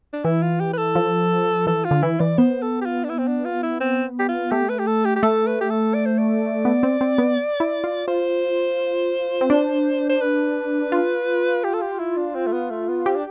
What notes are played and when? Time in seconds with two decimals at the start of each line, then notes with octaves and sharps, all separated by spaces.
0.13 D4
0.25 E3 E4
0.42 F4
0.60 G4
0.73 B4
0.78 A4
0.95 F3
1.67 E3 A4
1.85 F4
1.91 D3
2.03 E3 E4
2.20 E3 D5
2.38 B3 C5
2.62 A4
2.81 G4
2.85 F4
3.04 D4
3.09 E4
3.19 C4
3.28 D4
3.45 F4
3.63 E4
3.80 C4
4.19 G4
4.28 F4
4.51 A3 G4
4.69 B4
4.79 G4
4.87 A4
5.05 G4
5.16 G4
5.23 A3 A4
5.47 B4
5.61 G4
5.70 A4
5.94 D5
6.06 C5
6.18 D5
6.65 B3
6.83 C4
7.01 C4
7.18 B3
7.60 E4
7.84 F4
8.08 F4 C5
9.41 C4
9.50 D4
10.09 C5
10.21 B4
10.92 F4
11.64 G4
11.74 A4
11.81 G4
11.99 E4
12.17 D4
12.35 C4
12.47 A3
12.52 B3
12.70 A3
12.88 B3
13.06 C4 G4
13.16 D4